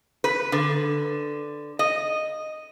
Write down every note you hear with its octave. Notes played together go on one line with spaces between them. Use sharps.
B4
D3
D#5